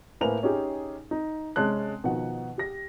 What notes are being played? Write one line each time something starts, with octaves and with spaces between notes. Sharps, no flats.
A2 A#3 B4 C5 G#5 F7
C#4 D#4 G4 G#4
D#4
C3 G#3 C#4 A5 F#6
B2 D#3 F3 D#4 F#5
G4 A#6